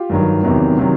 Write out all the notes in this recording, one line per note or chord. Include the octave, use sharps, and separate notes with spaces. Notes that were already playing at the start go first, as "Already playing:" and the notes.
Already playing: F4 G4
G2 D#3 F#3
E2 C3 D#3 F#3
C3 D#3 F#3